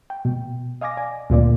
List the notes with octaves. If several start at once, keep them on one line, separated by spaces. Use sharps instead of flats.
G5
B2
D#5 F5 G#5 D6 A#6
D5 G#5
D2 A#2 A#3 D5